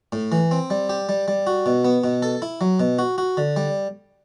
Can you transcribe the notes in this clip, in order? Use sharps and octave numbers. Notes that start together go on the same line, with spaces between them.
A2
E3
C4
G3
G4
G3
G3
F#4
B2
B3
B2
A4
E4
F#3
B2
F#4
F#4
D3
G3